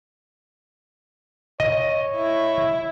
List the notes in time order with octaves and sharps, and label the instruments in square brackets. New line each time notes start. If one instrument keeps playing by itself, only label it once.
[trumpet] C#5 [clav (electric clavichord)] D#5
[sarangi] E4